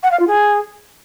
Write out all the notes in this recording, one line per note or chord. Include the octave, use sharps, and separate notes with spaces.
F#5
F5
F4
G#4